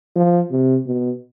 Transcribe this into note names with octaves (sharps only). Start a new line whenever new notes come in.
F3
C3
B2